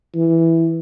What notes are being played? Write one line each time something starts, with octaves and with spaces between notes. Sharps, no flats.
E3